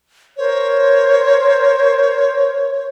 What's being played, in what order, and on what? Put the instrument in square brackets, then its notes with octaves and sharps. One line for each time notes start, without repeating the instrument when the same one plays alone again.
[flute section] A#4 C5 [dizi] C#5